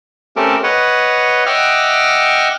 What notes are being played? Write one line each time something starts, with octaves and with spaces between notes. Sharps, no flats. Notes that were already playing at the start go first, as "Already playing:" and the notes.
A3 C4 C#4 G4 A4 A#4
B4 C#5 D#5 F#5
D#5 E5 F#5 G5 D6 F6